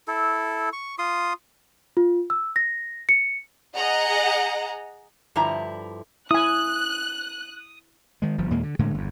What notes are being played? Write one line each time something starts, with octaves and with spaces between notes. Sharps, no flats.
E4 A4
C#6
F4 C6 D#6
F4
E6
A#6
C#7
G#4 D#5 F#5 A#5
G2 D3 F3 E4 A#5
E4 G#5 D#6 F#6
D#3 G#3
G1 F3
D#2 A#2 G#3 A#3
D3
A2 D3 G#3 A3
G1 E2